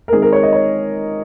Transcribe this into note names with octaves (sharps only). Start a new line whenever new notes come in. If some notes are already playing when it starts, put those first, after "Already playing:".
A#4
D#3 G#3 C4 D#4 G#4
A#4
C#5
D#5
C#5